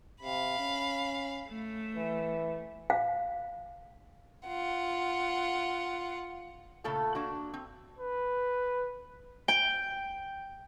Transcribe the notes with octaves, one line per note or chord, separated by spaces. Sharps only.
C3 F5 B5
C#4
A3
E3
F5
F4 F#5
A#2 C#3 A3 F4 A4 A5
A#3 D4 F#4
C4
B4
G5